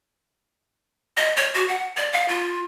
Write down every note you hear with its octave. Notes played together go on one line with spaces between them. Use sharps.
D#5
C#5
F#4
F#5
D5
F5
F4